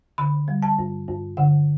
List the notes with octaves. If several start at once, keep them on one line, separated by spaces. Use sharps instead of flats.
D3 B5
G3
A5
G2
G2
D3 F#5